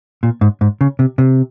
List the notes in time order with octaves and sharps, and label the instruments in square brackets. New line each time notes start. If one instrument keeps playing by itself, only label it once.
[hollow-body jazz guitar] A#2
G#2
G#2
C#3
C3
C3